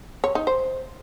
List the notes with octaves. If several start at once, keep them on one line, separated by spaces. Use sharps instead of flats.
C#5
D#4
C5